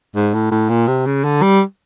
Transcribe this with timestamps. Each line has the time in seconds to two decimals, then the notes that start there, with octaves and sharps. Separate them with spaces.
0.15 G#2
0.34 A2
0.51 A2
0.69 A#2
0.88 C3
1.06 C#3
1.24 D3
1.42 G3